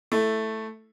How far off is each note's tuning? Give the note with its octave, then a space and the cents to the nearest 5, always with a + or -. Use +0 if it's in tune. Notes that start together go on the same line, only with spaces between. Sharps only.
A3 +0 E4 +0